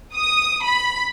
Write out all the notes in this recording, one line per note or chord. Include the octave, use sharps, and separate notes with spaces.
D#6
B5